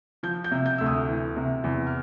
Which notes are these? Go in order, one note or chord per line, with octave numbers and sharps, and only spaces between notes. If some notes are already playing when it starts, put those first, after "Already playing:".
F3 G6
G6
C3
G6
D2 E6
D#6
E3
C3
E2
F6